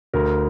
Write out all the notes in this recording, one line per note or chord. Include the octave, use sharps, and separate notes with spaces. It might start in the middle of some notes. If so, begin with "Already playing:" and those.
D2 A#4